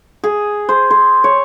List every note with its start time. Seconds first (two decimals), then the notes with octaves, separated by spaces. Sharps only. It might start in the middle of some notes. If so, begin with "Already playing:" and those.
0.24 G#4
0.69 C5
0.91 C5
1.24 C#5